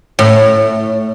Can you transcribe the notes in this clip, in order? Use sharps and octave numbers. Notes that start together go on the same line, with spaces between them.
A2